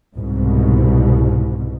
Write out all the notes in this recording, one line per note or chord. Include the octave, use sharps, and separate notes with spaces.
C2 G#2 B2